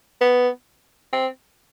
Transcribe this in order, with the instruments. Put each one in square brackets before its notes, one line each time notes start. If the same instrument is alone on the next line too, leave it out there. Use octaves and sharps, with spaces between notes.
[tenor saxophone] B3
C4